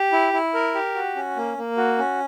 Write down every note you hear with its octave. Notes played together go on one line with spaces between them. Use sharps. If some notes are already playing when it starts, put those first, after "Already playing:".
Already playing: G4
E4
E4
A#4
G4
F#4
C#4
A#3
A#3
F#4
C#4